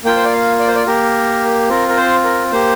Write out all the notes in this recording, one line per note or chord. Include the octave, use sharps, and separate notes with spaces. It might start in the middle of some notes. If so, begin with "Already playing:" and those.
A#3 F4 G5
C5
D5
F5
D5
C5
D5
A#3 G4 A#4
C4 F4 A#4
A#4
C5
A#4
A#3 G4 C5